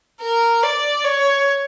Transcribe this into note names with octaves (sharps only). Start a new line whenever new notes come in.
A#4
D5
C#5